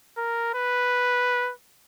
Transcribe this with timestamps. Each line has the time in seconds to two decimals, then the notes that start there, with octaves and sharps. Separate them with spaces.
0.17 A#4
0.54 B4